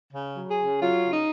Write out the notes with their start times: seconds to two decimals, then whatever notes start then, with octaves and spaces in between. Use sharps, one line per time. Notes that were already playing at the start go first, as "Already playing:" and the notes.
0.12 C#3
0.35 F#3
0.50 G#4
0.58 C#3
0.81 F#3 F4
1.03 C#3
1.11 D#4